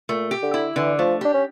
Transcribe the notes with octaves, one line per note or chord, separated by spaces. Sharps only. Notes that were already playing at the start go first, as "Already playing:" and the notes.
A#2 A3
G4
D3
E4
D3 E3
F3 A3
D4 G4
C#4